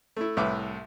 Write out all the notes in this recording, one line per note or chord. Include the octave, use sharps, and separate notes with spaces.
A3 E4
C2 A2 B4 E5 D6